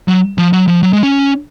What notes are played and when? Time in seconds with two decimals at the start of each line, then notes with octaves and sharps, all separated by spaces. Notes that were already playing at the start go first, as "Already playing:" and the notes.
0.08 F#3
0.38 F3
0.53 F#3
0.68 F3
0.83 F#3
0.93 G#3
1.03 C#4